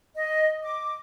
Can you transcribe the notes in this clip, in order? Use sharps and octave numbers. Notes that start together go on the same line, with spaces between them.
D#5
D6